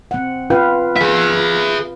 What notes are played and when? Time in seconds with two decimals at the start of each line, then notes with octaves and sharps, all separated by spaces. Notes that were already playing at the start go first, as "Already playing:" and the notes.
0.11 C4 F#5
0.50 C#4 F4 B4 F5
0.97 G#4 E5